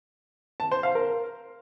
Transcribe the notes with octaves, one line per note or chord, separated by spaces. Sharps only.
A5
C5
F5
A#4